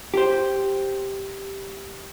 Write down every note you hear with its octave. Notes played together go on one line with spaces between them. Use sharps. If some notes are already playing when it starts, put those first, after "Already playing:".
G4 C5